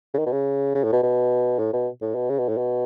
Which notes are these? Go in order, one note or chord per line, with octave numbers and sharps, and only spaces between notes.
C#3
D#3
B2
C#3
C#3
A2
B2
B2
A2
B2
A2
B2
C#3
B2
A2
B2